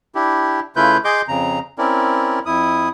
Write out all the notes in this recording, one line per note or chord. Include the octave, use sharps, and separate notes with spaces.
D4 E4 G4
C#3 A3 E4 F4 B4 G6
G#4 D#5 C6 D6 G6
F2 C#3 A#5
C4 C#4 E4 A#4 D5
F2 E4 D#6